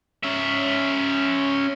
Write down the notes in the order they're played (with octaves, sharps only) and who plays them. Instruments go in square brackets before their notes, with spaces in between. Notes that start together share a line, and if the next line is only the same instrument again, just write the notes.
[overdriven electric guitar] C#4 E5